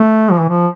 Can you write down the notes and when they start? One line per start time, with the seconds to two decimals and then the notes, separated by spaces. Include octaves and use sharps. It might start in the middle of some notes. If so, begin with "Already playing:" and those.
Already playing: A3
0.31 F3
0.40 E3
0.49 F3